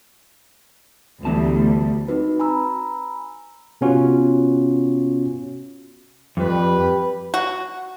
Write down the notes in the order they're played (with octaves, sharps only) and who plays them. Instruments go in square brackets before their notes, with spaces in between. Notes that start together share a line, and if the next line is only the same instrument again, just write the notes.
[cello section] D2 G3 [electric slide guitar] E3 B3 A5
[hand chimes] C4 D#4 F#4 B4
G#5 A#5 B5 E6
[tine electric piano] C3 B3 C#4 F4 F#4
[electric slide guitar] F2 [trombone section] G3 B4
[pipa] F#4